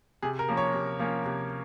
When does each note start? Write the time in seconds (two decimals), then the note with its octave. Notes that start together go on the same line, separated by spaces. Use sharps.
0.22 C3 G#4
0.39 A#4
0.49 F3 A#3 C#4
0.57 C#5
0.74 C3
0.99 F3 A#3 C#4
1.25 C3